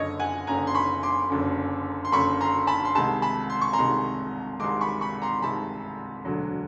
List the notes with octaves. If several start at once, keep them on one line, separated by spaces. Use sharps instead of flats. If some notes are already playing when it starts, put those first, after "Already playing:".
Already playing: F#1 F#2 D3 C#5 D#5
F#5 G#5
F#1 F#2 D3 G#5 A#5
C6
B5 C#6
C6 D6
F#1 F#2 D3
C6
F#1 F#2 D3 B5 C#6
A#5 C6
A5 B5
C6
C2 C3 D#3 G#3 A5 B5
A5 B5
C6
C#6
A#5 C6
C2 C3 D#3 G#3
C2 C3 D#3 G#3 C6 D6
B5 C#6
B5 C#6
A#5 C6
C2 C3 D#3 G#3 A5 B5
E1 D2 D3 F#3